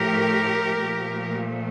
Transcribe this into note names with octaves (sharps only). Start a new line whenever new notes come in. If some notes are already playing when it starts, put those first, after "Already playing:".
Already playing: A2 F3 A3 G4 A#4
A#2 F3 A3